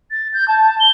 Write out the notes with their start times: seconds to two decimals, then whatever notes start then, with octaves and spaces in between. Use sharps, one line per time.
0.11 A6
0.34 G6
0.48 A5
0.64 A5
0.80 G7